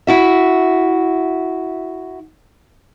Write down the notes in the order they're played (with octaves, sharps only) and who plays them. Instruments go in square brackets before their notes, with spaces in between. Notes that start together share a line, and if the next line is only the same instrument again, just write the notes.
[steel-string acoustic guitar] E4 F#4 E5